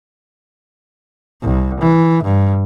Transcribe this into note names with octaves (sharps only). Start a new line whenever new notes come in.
C2
E3
G2